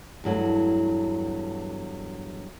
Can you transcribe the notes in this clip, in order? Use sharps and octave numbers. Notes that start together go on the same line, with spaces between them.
E2 G2 F#3 A3